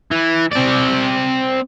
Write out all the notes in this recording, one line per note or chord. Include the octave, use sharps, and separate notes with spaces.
E3
C4 D5